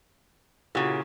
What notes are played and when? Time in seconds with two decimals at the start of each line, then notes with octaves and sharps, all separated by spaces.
0.75 A#2 C#3 E4 F#4 G4